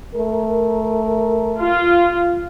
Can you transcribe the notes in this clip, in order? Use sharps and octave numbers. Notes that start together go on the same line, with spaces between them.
A3 A#4
F4